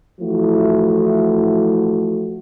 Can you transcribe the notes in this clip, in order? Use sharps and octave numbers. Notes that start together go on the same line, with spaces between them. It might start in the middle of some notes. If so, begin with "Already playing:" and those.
E3 F3 A3 E4 F#4